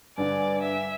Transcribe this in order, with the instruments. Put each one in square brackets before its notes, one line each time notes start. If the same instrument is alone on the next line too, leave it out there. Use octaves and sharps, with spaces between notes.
[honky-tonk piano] G2 D3 [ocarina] B4 [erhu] D5 [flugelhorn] G#5
[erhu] E5